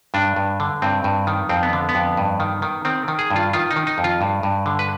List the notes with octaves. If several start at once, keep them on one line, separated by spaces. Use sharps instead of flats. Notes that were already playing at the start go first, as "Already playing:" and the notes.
G2 D4
G2
D3
G2 C4
G2
D#3
F2 C4
B3
D3
B3
F2
G2
D#3
D#3
D#3 C4
D#3
G#4
G2
F4
D#3 F4
D#4
D#3
D#4
F2
F4
G2
G2
D3
B4